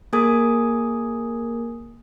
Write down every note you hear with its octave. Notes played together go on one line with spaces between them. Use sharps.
A#3 G#4 A#4 G#5 D#6 G#6